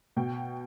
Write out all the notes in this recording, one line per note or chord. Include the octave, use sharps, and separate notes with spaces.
B2 G5